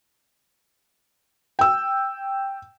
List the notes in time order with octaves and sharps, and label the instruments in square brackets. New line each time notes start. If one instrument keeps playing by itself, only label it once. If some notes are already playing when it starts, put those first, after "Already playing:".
[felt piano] G5 E6